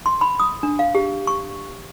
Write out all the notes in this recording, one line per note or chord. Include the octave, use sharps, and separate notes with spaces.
C6
B5
D#6
D4
F5
G4
C#6